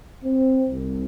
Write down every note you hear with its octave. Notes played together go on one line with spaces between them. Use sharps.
C4
C2